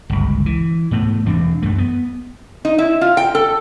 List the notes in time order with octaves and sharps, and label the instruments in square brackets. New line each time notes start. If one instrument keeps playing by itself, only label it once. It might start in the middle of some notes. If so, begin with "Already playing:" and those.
[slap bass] G1 C#2
E3
G#2 A3 B3
E1 E3 C4 D4
F#2 A3
B3
[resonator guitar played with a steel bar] D#4
E4
F4
G5
A4